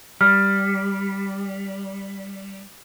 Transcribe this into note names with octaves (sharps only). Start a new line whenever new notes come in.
G3 F6